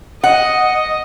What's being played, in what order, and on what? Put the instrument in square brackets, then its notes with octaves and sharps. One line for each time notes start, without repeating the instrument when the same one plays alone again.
[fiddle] D#5 [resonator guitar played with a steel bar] F#5